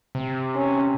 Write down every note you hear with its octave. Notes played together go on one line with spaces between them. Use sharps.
C3
C#4